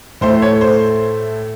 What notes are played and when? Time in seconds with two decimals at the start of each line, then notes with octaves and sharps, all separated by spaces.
0.21 A2 A3 C5
0.42 C#5
0.61 C5